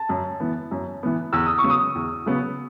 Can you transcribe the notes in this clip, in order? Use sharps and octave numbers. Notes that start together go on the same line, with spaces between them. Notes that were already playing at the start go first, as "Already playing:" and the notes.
Already playing: A5
F#2
E3 B3
F#2
E3 B3
E2 E6
D#6
C#6
C#3 F#3 B3
D#6
E2
C#3 F#3 B3